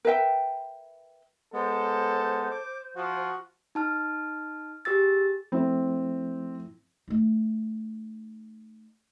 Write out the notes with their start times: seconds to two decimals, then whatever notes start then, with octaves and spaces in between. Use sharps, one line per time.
0.05 A#4 B4 E5 G5
1.53 G#3 B3 A4 C5
2.51 D6
2.96 F3 F#4
3.75 D#4 A5 F6
4.85 G4 G#4 E6 A6
5.52 F3 A3 C4 E4
7.08 A3 D#4